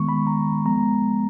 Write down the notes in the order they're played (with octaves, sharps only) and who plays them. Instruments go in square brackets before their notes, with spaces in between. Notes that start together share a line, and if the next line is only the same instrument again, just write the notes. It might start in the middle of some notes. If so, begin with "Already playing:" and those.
Already playing: [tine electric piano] D#3 G#3 B3 C#6
B5
A#5
F3 G#3 B3 A#5